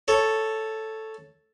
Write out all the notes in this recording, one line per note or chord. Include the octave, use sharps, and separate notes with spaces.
A4 C#5